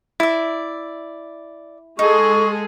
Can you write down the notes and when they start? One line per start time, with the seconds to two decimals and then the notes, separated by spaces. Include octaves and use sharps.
0.20 E4 D5 E5
1.99 G#3 D#4 G#4 A4 C#6